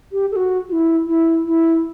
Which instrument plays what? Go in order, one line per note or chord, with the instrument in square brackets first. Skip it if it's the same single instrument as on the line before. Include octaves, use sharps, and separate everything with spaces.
[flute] G4
A4
F#4
F#4
E4
E4
E4